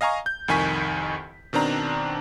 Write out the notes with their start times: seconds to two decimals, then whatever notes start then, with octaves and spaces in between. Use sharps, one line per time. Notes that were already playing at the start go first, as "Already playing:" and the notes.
0.01 D#5 F5 G#5 A#5 C#6
0.26 G6
0.48 C2 F2 D#3 G#5 C#6 B6
1.53 B2 D#3 C4 D4 A#5